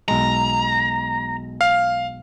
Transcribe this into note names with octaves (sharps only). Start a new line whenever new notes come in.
B1 G#3 A#5
F5